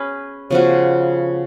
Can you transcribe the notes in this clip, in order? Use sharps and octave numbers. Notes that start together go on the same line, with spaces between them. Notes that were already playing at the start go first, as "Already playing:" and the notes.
Already playing: C#4 G#4 B4
C#3 F3 B3 F#4